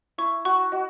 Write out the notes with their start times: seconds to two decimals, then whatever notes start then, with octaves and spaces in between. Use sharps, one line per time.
0.18 E4 C#6
0.45 F#4 C#6
0.72 F#4 D#5